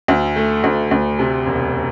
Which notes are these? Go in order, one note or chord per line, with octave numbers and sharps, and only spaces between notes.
D2
A3
D2
D2
C3
E1